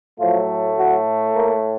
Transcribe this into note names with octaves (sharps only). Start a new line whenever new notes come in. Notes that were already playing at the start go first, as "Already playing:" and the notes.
A2 F3 F#3 A3 F4
F#3 F#4
A#3 A#4